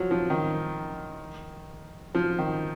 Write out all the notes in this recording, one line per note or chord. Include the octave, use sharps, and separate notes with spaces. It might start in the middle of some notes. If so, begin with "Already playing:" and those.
Already playing: F3 F#3
F3
D#3
F3
D#3